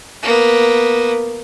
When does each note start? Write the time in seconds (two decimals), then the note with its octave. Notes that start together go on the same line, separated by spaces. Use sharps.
0.23 A#3 B3